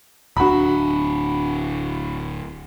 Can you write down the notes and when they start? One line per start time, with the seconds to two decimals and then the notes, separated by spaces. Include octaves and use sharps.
0.37 D1 D4 F#4 B5